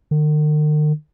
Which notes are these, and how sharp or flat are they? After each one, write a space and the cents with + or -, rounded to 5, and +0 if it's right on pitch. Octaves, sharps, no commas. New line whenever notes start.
D#3 -45